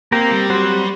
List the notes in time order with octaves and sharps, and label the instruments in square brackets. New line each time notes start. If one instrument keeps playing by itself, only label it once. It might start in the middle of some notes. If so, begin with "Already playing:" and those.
[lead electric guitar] A#3 [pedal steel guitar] C4 G4 A#4
[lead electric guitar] G3
[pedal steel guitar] F#3 C4 F#4 C5